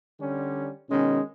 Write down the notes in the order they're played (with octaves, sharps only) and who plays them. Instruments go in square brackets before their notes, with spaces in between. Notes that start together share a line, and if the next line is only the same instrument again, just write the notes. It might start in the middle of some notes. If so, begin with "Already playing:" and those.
[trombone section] D3 G3 C#4
[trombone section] B2 D#3 G#3 [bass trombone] C#4